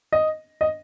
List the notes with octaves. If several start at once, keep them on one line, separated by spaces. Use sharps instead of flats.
D#5
D#5